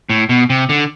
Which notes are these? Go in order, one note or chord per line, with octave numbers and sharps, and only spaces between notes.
A2
B2
C3
D3